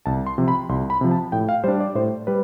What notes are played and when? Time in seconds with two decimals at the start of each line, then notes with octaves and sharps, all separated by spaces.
0.06 C2 A5
0.26 C6
0.38 C3 F3
0.48 B5
0.69 C2 C6
0.90 B5
1.01 C3 F3
1.11 A5
1.32 A2 G5
1.49 F5
1.64 G3 D4 C5
1.81 D5
1.95 A2 C5
2.27 G3 B4